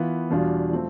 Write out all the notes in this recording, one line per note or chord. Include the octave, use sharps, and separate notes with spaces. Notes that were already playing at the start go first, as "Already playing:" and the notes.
Already playing: E3 B3 F4
E2 B2 G3 D4 F4
F3 A3 C4